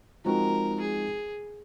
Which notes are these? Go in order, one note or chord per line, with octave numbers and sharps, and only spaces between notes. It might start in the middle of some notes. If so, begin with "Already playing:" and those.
F3 G#3 C4 D#4 F#4 A#4
G#4